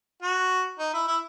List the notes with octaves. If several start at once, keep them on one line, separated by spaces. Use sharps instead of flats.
F#4
D#4
E4
E4